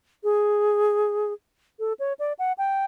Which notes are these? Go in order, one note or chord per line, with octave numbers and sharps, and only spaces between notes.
G#4
A4
C#5
D5
F#5
G5